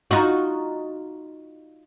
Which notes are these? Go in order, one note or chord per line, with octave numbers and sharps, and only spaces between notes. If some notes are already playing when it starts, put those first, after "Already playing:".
D#4 F4 F#4